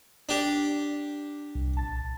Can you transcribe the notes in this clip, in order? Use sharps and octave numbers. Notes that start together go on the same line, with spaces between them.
D4 G4
C2
A#1 A5 A6